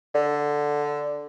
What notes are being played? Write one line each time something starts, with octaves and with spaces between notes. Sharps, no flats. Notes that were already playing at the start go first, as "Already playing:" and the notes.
D3